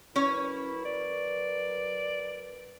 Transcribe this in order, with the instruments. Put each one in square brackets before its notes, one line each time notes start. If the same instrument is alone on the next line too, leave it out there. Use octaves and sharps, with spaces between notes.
[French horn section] F#3 A#4 B4 [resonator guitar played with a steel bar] C#4 C#5 [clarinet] E4
[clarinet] D5